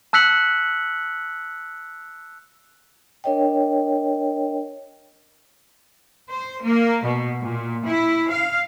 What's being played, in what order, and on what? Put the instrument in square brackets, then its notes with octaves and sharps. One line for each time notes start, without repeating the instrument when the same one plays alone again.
[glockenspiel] A5 E6 F#6 B6 C#7 F#7
[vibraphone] D4 A#4 C#5 D#5 G5
[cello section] C5
A#3
B2
A#2
E4
F5